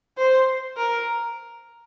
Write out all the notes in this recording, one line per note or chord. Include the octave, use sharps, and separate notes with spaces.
C5
A#4